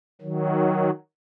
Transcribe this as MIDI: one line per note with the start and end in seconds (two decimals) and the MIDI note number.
0.21 0.90 51
0.21 0.90 54